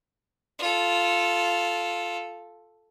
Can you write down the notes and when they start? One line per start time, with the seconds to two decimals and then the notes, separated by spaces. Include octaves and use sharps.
0.59 F4 A4